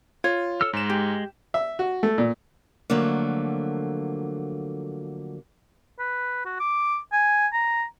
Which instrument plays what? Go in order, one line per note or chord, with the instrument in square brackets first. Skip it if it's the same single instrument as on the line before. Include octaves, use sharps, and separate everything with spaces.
[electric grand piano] F4 [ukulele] C#5
[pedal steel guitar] A4 E6 F6
[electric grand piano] G#2 E7 [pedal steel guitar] G#3
[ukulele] G4
[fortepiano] E5
F#4
A3
A#2
[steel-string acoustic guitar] D3 F3 F#3 A3 A#3
[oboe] B4
F#4
D6
G#5
A#5